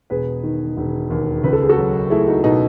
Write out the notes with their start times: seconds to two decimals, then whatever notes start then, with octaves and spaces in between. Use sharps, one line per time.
0.10 E1 G#4 B4
0.43 D#3
0.77 E1
1.10 D#2
1.44 C#2 B4
1.53 A4
1.62 G#4
1.69 F#4 A4
1.77 F#3
2.10 A3 E4 G#4
2.27 D#4 F#4
2.43 B2 D#4 F#4